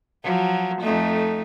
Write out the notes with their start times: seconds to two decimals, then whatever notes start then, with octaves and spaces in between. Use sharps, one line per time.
0.23 F3 F#3
0.81 F2 A3 D#4